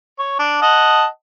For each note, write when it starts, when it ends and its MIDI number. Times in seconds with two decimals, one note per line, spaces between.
0.19 0.37 73
0.39 0.61 62
0.62 1.06 75
0.62 1.06 78
0.62 1.06 81